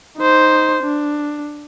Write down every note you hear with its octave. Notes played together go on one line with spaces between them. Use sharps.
D#4 C5
D4